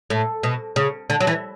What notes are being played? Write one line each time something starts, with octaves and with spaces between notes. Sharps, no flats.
A2
B2
C#3
D3
F#3
E3